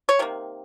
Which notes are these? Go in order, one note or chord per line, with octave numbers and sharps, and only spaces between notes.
C#5
C3 D#3 A#3